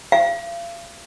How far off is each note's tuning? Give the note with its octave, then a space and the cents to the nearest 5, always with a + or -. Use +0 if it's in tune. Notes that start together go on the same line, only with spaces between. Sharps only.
F5 -35